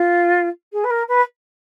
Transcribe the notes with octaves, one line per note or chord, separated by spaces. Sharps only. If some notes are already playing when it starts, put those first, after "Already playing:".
Already playing: F4
G#4
B4
A#4
B4